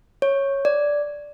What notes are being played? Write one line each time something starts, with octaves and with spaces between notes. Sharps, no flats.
C#5
D5